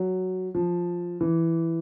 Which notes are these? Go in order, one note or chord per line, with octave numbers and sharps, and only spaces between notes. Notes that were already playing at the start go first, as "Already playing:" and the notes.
Already playing: F#3
F3
E3